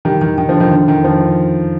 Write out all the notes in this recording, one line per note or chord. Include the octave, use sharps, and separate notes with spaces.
D#3 G3
D#3
D#3
D3 F3
D#3
D3
D#3
D3 F3